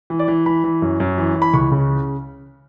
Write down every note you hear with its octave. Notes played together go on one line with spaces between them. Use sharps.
E3
D5
E3
E3 B5
E3
F#2
F#2
E3
E3
B5
C#2 C#6
C#3